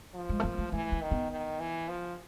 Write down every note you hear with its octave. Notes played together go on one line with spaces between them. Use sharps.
F3
G#3
A3
A#3
A3
E3 A3
A#3
D#3
B3
D#3
E3
F3